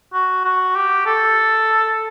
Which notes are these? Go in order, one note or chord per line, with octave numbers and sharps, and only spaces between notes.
F#4
F#4
G4
A4